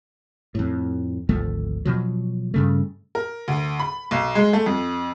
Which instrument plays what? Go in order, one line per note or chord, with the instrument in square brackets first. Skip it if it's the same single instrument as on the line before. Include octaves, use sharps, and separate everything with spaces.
[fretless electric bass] F2 A2
G#1 D2 F3 A3
B2 F3 F#3
G2 C#3 A3
[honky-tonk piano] A#4
D2
B5
B1
G#3
A3
F2